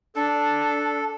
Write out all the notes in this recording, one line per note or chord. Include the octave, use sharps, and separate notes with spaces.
D4 A4